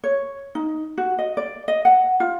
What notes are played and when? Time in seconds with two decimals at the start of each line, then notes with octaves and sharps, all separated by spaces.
0.04 C#5
0.55 D#4
0.98 F#4
1.18 D#5
1.37 D5
1.68 D#5
1.85 F#5
2.20 F4